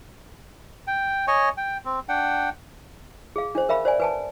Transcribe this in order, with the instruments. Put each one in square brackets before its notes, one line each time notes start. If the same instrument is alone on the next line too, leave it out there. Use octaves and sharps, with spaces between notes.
[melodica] G5
C#5 D#5 G#5 C#6
G5
C4
D4 F#5 G5
[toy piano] G#4 F5
D4 C5
A#4 E5 F5 B5
C5 D5 G#5
B4 G#5 A5